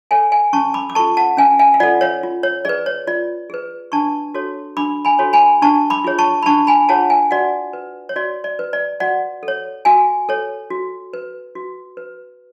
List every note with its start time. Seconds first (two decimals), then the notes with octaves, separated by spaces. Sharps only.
0.11 A4 C#5 F5 G#5
0.32 F5 G#5
0.53 C#4 A5 C#6
0.74 B5 D6
0.90 D6
0.95 A4 A5 C#6
0.99 F4
1.17 F#5 A5
1.37 C#4 F5 G#5
1.59 F5 G#5
1.74 F5
1.80 F4 D5 F#5
1.83 A4
2.01 C#5 F5
2.23 F4
2.43 C#5
2.65 G#4 B4 D5
2.86 C#5
3.07 F4 D5
3.50 G#4 B4
3.92 D4 A5 C#6
4.34 F#4 A4 C#5
4.77 D4 B5 D6
5.05 G#5 B5
5.19 F#4 A4 C#5
5.33 G#5 B5
5.62 D4 A5 C#6
5.90 B5 D6
6.04 F4 G#4 C#5
6.18 A5 C#6
6.43 B5
6.46 D4 A5 C#6
6.67 G#5 B5
6.89 F4 G#4 C#5 F#5 A5
7.10 F5 G#5
7.31 F#4 D5 F#5
7.73 B4
8.09 C#5
8.16 F#4 D5
8.44 D5
8.59 B4
8.73 D5
9.00 F#4 D5 F#5
9.43 A4
9.48 C#5
9.85 F#4 F5 G#5
10.29 A4 C#5
10.70 F#4
11.13 B4
11.55 F#4
11.97 B4